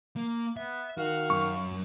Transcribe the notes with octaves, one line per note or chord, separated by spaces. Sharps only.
A#3
B3 E5
D#3 F#4 F5
F#2 C#6